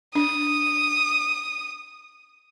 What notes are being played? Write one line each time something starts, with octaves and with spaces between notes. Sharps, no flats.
D4 D#6